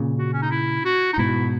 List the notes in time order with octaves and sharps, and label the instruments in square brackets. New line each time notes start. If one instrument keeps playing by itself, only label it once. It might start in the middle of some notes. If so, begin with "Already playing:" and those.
Already playing: [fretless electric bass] A#2 C#3
[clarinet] F#4
C#4
D#4
E4
F#4
D#4
[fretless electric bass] G#2 B2 [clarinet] E4